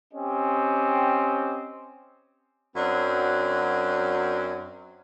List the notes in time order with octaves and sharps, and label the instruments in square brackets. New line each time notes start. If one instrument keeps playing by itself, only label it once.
[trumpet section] C4 C#4 G4 D#5
[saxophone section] F#2 F#3 C4 D4